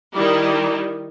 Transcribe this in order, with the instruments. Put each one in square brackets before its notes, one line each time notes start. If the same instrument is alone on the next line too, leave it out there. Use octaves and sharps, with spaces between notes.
[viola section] D#3 G3 D#4 E4 G4